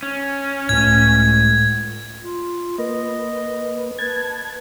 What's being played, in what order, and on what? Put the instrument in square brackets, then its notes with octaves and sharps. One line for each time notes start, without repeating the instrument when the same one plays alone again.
[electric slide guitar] C#4
[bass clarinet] C#2 [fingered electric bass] A2 A3 [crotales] G#6
[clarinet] F4
[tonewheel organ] A#3 B4 [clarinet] D#5
[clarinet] B4 [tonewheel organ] A5 G#6